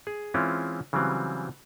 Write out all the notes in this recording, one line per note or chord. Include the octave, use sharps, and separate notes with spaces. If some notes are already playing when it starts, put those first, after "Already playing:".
G#4
E3 G#3 C4 C#4 E4 F4
C#3 E3 F#3 G3 C4